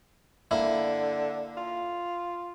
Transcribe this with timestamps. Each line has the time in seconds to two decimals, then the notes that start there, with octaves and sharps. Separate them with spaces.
0.51 D3 A#3 E4 E5
1.57 F4